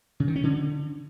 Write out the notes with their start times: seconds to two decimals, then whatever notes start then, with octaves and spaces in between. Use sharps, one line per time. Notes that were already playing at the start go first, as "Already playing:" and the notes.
0.20 C#3
0.28 D#3
0.36 C#4
0.43 D3